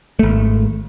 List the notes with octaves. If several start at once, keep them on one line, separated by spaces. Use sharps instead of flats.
G#1 A3